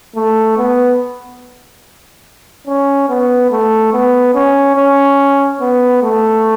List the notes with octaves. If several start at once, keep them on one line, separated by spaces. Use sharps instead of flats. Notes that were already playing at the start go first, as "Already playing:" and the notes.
A3
B3
C#4
B3
A3
B3
C#4
C#4
B3
A3